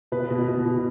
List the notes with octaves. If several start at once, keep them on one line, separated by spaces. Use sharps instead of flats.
B2 B4
B2
B2
B2